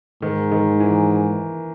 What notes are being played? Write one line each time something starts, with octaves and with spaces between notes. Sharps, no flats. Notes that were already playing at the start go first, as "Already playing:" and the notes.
G#2 D#3
D#3
E3